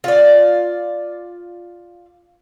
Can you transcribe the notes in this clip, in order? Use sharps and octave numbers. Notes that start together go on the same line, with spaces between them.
F4 D5